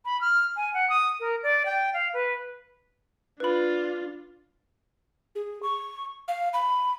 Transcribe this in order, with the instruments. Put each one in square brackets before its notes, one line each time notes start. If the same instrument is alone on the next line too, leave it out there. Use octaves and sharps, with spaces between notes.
[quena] B5
F6
G#5
F#5
D#6
A#4
D5
G5
F5
B4
[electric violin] D4 F4 [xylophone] B4 B5
[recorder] G#4
C#6
F5
B5